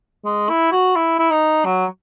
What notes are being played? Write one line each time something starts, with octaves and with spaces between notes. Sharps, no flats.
G#3
E4
F#4
E4
E4
D#4
F#3